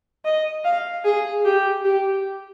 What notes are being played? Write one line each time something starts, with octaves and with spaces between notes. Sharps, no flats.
D#5
F5
G#4
G4
G4